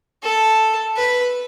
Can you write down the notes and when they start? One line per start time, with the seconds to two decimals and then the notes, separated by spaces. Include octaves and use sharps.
0.23 A4
0.97 B4